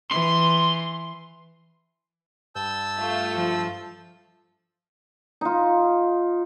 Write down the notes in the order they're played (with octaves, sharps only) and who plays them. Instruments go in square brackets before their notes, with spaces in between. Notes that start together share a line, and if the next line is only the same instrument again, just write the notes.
[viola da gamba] E3 [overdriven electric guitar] C6
[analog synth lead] G2 [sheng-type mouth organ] A5 E6 G6
[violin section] A3 F4
[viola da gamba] F3
[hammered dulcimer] D#4 F4